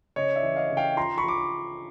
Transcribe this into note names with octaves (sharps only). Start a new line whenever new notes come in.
C#3 C#5 D#5
D5 E5
E3
D#5 F5
C#3
F5 G5
F3 A#5 C6
B5 C#6
F3 D6